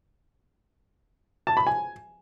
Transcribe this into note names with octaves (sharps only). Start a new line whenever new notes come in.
A5
B5
G#5